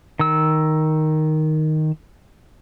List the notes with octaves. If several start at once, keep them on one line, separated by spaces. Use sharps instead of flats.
D#3 E6